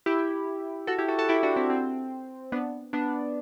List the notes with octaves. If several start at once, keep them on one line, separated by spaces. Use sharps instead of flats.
E4 G4
F#4 A4
E4 G4
F#4 A4
F#4 A4
E4 G4
D4 F#4
C4 E4
C4
B3 D4
B3 D4